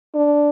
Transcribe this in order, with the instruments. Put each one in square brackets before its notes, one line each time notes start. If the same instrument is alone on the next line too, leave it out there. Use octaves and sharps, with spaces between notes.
[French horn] D4